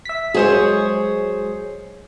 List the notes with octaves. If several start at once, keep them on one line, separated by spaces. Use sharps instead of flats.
E5 B6
F#3 G#3 G#4 C5 C#5